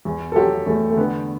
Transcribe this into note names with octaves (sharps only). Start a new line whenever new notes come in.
E2
A4
F#3 G4
E2 A3
A3
D3 B3